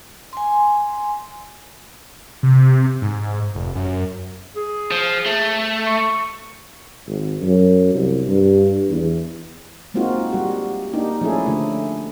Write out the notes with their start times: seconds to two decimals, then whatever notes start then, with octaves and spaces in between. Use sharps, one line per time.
0.33 G#5 C6
2.43 C3
3.02 G#2
3.55 F1
3.75 F#2
4.56 G#4
4.91 F3
5.26 A3
5.87 C#6
7.07 G#1
7.42 F#2
7.94 C2
8.27 G2
8.90 E2
9.94 G#3 A#3 C4 D#4 F4 F#4
10.33 G3 F#4
10.93 A#3 D4 D#4 G4
11.21 F3 A3 C#4 E4 G#4 A4
11.46 D3 A3